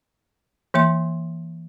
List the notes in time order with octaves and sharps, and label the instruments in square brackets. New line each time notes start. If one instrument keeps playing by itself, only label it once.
[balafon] E3 A#3 E5 C6